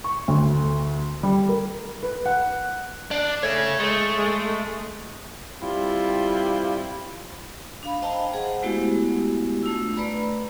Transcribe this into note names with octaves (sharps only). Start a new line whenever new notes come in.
C#6
D2
G3
A#4
B4
F#5
D4
A3 G#4 C#5
G#3 A3
G#3
G3 C4 E4 F4
D4 F5 B5
C5 D#5 F5 G5 A5 A#5
G#4 C5 F#5
G#3 A3 B3 E4 F#4 G4
A3 D4 F4 E6
A3 B4 D5 A#5 B5